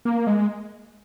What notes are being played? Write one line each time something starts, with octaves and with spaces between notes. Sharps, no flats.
A#3
G#3